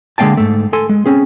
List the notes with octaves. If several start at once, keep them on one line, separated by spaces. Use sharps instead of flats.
D3 G#3 A#3 F5 G5 A5
G#2 A3
A4 G#5 C6
G#3
C4 C#4 G#4